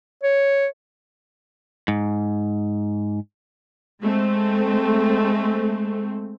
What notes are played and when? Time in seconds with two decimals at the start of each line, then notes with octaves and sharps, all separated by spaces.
0.23 C#5
1.88 G#2
4.01 G#3 A3 C4